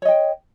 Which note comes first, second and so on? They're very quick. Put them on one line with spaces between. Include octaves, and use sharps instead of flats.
C#5 D#5 G5